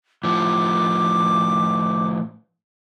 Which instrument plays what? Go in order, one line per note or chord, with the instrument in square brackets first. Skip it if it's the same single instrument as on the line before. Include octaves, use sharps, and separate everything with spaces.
[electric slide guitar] A2 F3 [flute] D6